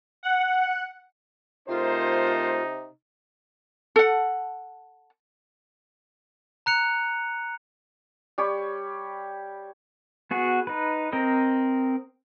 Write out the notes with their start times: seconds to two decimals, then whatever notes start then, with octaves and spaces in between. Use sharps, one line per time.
0.23 F#5
1.68 C3 A3 D#4 F4 A#4 C5
3.96 A4 F#5
6.66 A#5 F#6 C#7 F7
8.38 G3 G4 C#5 B5
10.31 B3 F#4 G#4
10.67 D#4 B4
11.13 C4 A#4 D#5